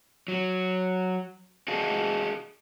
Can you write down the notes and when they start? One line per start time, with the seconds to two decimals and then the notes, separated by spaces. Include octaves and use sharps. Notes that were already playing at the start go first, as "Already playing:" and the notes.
0.28 F#3
1.68 F#4 G#4 D#5 F5 A5